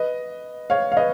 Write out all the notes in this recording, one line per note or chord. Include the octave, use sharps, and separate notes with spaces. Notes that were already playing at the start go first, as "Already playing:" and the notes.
Already playing: B4 D#5
C#5 F5
F5
B4 D#5